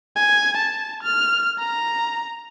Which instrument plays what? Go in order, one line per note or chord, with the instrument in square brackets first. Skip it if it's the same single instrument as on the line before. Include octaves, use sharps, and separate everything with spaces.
[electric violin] G#5
A5
F6
A#5